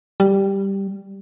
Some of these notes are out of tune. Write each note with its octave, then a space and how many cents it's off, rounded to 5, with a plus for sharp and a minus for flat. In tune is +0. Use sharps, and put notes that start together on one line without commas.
G3 +0